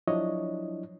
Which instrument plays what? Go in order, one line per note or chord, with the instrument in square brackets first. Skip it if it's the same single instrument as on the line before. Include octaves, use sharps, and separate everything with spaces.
[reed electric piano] F3 F#3 D4 E4 C#5 D#5